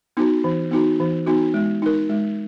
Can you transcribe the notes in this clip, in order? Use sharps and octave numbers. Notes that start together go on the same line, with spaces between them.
B3 D#4 F#4
E3
B3 D#4 F#4
E3
B3 D#4 F#4
G#3
D#4 A#4
G#3